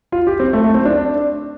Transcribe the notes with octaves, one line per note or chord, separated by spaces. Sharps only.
F4
G4
C4
A3
A3
C4
D4